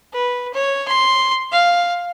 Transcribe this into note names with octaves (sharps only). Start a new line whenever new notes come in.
B4
C#5
C6
F5